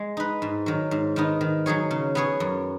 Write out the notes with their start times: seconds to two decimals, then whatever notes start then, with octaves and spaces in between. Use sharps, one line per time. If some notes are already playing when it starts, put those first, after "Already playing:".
Already playing: G#3
0.17 D#4 B4
0.42 G#2
0.66 D#3 F#3
0.91 G#2
1.16 D#3 B3 D#4
1.41 D#3
1.66 F#3 D#4 G#4 C#5
1.91 C#3
2.15 B3 G#4 C#5
2.40 F#2